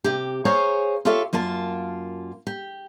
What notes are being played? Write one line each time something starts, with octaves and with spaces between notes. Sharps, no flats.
C3 G4
G#4 C5 C#5 F5 G#5 A#5
F4 G4 A4 C#5 E5 F5
F#2 A#3 F4 A5
G4